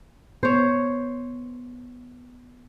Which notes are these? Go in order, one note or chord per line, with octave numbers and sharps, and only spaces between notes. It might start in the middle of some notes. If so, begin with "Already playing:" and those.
B3 C5 C#5